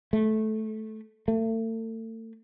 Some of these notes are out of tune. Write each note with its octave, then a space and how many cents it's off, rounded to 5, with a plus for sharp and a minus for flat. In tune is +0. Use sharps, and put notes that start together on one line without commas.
A3 -15
A3 +35